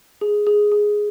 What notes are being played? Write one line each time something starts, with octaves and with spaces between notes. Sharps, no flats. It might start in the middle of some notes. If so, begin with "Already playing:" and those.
G#4
G#4
G#4